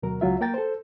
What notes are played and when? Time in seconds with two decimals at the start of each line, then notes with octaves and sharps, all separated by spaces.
0.03 D2 B2 F#3 A#4
0.21 C#2 F#3 F4 E5
0.41 A#3 A#4 G5 A6
0.54 A4 C5